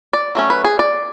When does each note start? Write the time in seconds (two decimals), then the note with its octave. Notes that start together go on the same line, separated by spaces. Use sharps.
0.13 D5
0.35 F#3 A3 C#4
0.50 B4
0.64 G#4
0.79 D5